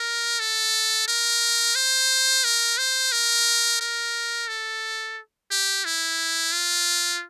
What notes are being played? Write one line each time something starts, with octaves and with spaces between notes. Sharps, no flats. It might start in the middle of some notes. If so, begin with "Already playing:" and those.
Already playing: A#4
A4
A#4
C5
A#4
C5
A#4
A#4
A4
G4
E4
F4